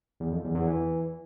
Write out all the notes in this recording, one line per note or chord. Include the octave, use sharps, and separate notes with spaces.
E2
F2
E2
E2
E3